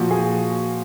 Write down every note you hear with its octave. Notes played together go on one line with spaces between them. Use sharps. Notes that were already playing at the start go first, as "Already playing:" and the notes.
Already playing: A#2 F3 F#4
G#4